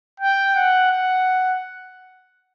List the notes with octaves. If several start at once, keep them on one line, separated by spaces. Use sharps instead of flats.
G5
F#5
F#5